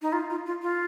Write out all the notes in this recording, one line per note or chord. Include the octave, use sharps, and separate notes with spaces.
D#4
F4
F4
F4
F4